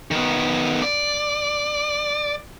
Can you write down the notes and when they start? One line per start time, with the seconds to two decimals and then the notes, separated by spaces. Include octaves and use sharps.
0.11 D#3 B3
0.82 D5